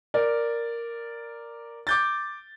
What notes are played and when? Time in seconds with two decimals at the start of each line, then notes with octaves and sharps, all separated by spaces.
0.14 A#4 D5
1.87 D6 G6 A6